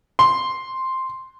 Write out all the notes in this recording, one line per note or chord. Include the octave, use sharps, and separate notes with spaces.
C6